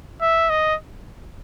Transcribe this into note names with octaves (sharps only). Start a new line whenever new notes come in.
E5
D#5